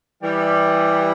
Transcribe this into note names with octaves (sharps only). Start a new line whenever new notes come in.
E3 G3